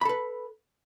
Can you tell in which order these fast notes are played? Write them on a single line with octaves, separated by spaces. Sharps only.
B5 A4 B4